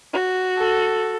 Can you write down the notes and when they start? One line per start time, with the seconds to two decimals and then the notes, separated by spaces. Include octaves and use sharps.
0.13 F#4
0.58 A4